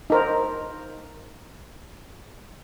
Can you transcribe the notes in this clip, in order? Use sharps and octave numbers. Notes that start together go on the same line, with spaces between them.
D#4 A#4 C5